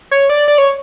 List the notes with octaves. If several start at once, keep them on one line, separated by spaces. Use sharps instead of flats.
C#5
D5
D5
C#5